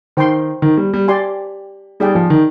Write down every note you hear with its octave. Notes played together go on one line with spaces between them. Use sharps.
D#3 C5 G5 C6
D#3
G3
G3
G4 D5 G#5 C6
G3 D#4 G#4 D5 G5
F3
D#3